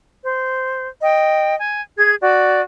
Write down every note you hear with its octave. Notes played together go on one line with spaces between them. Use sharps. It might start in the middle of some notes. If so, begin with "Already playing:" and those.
C5
D#5 G5
G#5
G#4 G#6
F#4 D5